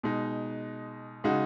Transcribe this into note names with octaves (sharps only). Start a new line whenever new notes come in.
B2 G#3 D#4
C#3 G#3 D#4 F#4